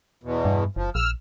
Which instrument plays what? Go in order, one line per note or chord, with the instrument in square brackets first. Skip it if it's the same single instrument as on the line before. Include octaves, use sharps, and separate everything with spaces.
[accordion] E2 B2
[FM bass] G2
[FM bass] F#1 [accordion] F3
[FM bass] A#1 [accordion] E6 F6